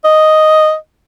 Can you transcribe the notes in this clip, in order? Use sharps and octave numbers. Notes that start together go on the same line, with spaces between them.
D#5